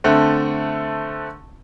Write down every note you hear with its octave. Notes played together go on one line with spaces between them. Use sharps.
D3 A3 C4